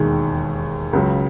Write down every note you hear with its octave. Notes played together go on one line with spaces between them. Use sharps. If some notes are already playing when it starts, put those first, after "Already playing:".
Already playing: E1 D#2 D#3 G#3
C#2 C#3 F#3